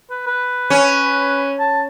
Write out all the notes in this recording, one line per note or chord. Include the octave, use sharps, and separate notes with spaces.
B4
B4
C#4
A5